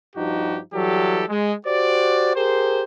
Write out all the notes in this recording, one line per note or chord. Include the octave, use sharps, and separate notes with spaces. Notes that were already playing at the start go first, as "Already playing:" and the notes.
G2 F3 D#4 F#4 G4
E3 F#3 G3 G4 A4
G#3
F#4 G4 C5 D5
G4 G#4 A#4 C5